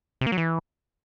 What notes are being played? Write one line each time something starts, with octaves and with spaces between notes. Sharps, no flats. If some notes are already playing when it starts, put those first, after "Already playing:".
C3
A#3
F#3
E3